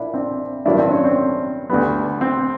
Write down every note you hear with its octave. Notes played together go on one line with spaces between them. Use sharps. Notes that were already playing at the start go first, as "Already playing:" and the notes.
Already playing: A#1 A#2 D4 E4
C4 D4
A1 G2 D#3 F#3 A#3 D4 E4
C4 D4
C#4
C4
D2 D3 G3 B3
C4